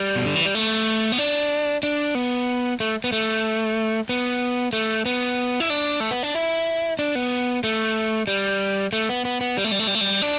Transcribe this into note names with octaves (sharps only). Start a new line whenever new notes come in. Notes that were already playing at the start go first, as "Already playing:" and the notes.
Already playing: G3
B2
D3
E3
G3
A3
B3
D4
D4
B3
A3
B3
A3
B3
A3
B3
E4
D4
A3
B3
D4
E4
D4
B3
A3
G3
A3
B3
B3
B3
G3
A3
G3
A3
G3
A3
G3
D4